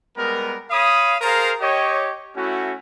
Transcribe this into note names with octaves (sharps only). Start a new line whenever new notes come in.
G3 G#3 B3 A#4
C#5 F5 B5 D#6
G#4 A#4 C5 F5 A5 A#5
G4 C#5 D#5
A3 C#4 E4 F#4